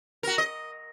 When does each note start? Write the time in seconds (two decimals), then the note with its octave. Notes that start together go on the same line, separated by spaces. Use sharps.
0.23 F#4 A#4
0.38 D#5